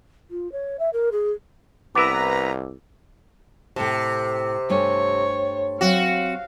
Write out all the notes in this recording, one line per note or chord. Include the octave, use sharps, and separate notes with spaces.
F4
C#5
E5
A#4
G#4
C2 B3 E4 B4 A#5 D6 E6
A2 C3 A4 A5
G2 A3 C#5 G#5
F#3 C4 F#4 F5